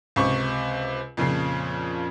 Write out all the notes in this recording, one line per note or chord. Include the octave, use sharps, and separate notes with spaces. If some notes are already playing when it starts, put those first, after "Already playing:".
C#2 C3 C#6
F2 A#2 C#3 F3 C7